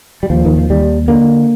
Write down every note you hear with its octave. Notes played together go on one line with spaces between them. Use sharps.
G3
D#2 F3
D#3
F3
D#2 G3
D3 A#3